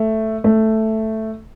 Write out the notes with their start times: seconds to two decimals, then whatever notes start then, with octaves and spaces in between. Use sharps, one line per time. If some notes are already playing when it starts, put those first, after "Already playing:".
Already playing: A3
0.44 A3